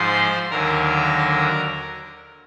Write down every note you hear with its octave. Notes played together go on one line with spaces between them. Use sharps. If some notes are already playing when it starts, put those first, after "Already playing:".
Already playing: G#2 F3 G#3 C5 C6
D#2 D3 F#3 A#4 A#5